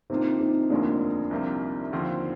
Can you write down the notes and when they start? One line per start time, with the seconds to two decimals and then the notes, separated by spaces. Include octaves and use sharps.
0.10 C3 D#3 A#3 C4 D4 D#4 F4
0.40 C4 D#4
0.70 F1 D#2 D3 F3 G#3 A#3 D4
1.31 C2 C3 F3 A#3
1.93 D#2 D3 F3 C4